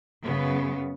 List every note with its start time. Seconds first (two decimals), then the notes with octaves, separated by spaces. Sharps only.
0.23 F#2 C#3 B3